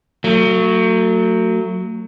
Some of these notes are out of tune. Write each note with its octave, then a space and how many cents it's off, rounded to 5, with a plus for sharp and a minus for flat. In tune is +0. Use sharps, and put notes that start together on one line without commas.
F#3 +0 A3 +40